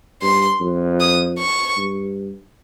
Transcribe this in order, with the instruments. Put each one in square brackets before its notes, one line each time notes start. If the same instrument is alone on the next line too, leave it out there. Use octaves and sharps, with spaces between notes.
[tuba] G2 [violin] C6
[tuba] F2
[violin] D#6
C#6
[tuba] G2